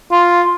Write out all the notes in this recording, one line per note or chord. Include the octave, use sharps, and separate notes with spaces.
F4